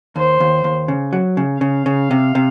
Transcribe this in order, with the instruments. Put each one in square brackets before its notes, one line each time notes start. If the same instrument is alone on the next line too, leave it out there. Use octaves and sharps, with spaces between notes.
[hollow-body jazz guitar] D#2 [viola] C5
[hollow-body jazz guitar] D#2
D#2
C#3
F#3
C#3
[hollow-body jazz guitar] C#3 [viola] F5
[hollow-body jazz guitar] C#3
C3
C3